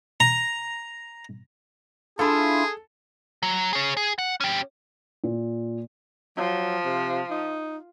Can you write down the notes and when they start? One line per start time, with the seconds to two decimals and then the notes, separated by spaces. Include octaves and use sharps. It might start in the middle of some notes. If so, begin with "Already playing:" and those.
0.20 A#5
2.19 D4 E4 F4 G#4 A4
3.43 F#3
3.73 G#4 C#5
3.97 G#4
4.19 F#5
4.41 C#4 G4
5.24 A#2
6.37 F3 F#3
6.85 C3
7.30 D#4